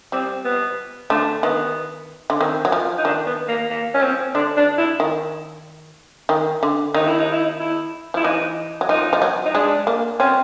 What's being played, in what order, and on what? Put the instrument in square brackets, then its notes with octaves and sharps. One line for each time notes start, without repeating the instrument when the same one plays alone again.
[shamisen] G3 [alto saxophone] C4
[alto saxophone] B3
[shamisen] D3 [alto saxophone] A3
[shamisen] D#3 [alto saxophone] B3
[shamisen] D3
[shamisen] D#3 [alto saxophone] C4
[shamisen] F#3
F3
[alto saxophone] D#4
[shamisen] D#3 [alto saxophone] D4
[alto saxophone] B3
A#3
A#3
C#4
C4
[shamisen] D3 [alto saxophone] D4
[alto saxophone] D4
E4
[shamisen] D#3
D#3
D3
[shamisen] D#3 [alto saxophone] D#4
[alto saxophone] E4
D#4
E4
D#4
E4
[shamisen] F3 [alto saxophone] E4
[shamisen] E3 [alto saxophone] D#4
[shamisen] F#3
[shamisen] F3 [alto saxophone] D#4
[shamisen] F3
F#3
[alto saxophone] D#4
[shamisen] G#3 [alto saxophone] D4
[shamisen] A#3
[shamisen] C4 [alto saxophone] C#4